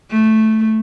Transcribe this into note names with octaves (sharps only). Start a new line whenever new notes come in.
A3